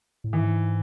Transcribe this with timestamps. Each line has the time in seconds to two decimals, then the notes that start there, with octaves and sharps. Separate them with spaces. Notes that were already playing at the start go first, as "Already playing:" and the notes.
0.24 A2
0.33 G#2 E3